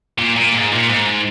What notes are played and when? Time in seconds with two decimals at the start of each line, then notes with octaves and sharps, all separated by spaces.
0.18 A#2
0.36 A#2
0.53 G#2
0.72 A#2
0.89 G#2